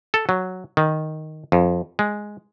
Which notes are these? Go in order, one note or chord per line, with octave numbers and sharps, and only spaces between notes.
A4
F#3
D#3
F2
G#3